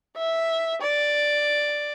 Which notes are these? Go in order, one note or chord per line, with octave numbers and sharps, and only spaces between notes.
E5
D5